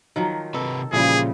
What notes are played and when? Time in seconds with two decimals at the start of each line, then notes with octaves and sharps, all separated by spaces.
0.16 D#3 F3 F#3 A#5
0.54 C3 A4 B4
0.93 A#2 C#3 E3 F3 G3 G#4